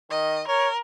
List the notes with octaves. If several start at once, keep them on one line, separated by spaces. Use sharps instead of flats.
D#3 D#5
A#4 C#5